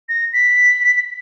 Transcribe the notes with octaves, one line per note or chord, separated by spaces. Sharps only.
A#6
B6